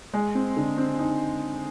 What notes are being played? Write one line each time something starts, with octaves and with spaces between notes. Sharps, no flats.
G#3
C4
D3
C4
D#4